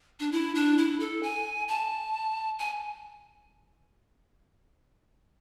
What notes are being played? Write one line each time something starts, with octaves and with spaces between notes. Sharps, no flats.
D4
E4
D4
E4
A4
G#5
A5
G#5